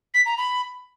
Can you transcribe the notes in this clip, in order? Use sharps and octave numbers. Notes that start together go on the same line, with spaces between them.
B6
A#5
B5